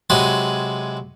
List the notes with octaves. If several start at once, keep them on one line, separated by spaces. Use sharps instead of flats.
C3 F#3 G#3 F#4 B4 D#6